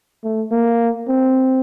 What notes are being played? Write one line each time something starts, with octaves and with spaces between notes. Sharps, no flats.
A3
A#3
C4